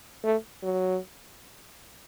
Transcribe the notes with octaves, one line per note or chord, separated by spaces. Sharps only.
A3
F#3